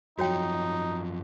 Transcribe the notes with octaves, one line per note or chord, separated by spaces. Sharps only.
F#2 F3 D#4 F#4 C#5 G5